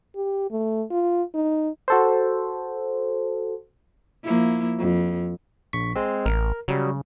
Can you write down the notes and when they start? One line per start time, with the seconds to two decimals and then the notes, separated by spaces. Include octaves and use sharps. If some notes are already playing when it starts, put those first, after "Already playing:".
0.16 G4
0.51 A3
0.91 F4
1.34 D#4
1.88 F#4 A4 C5
4.24 F3 A#3 E4
4.78 F2
5.73 A#1 C#6 B6
5.95 G#3 C4
6.26 A1 A#4
6.68 C#3 F#3 G3